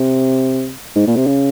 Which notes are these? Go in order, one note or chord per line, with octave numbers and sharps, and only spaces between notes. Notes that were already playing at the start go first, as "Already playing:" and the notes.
Already playing: C3
G#2
A#2
C3
C#3